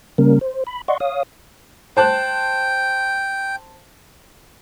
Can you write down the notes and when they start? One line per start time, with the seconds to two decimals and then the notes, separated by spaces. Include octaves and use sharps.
0.18 C#3 G3 A#3 C#4 A#4
0.41 C5
0.67 B5
0.88 D5 D#5 F#5 C6 C#6
1.00 C#5 F5 D#6
1.97 C5 G5 A5 F#6